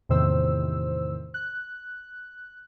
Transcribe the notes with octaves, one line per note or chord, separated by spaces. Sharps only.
E2 A2 C3 D#3 C5 E6
F#6